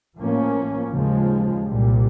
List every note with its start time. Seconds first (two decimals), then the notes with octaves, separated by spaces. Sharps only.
0.18 A2 F3 A#3 C#4
0.92 D#2 C#3 F3 G#3
1.68 C2 A#2 G3